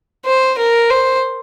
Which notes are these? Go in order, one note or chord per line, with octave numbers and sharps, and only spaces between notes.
C5
A#4
C5